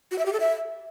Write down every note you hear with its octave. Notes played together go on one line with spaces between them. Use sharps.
F#4
E5
G4
A4
E5